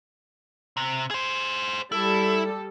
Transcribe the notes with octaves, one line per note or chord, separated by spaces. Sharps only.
C3
G#4 C5
G3 E4 A4